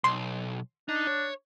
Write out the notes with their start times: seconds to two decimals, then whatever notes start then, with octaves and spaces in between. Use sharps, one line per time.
0.04 B1 C6
0.89 D4 D#4
1.07 C#5